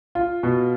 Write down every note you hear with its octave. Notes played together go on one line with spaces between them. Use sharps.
F4
B2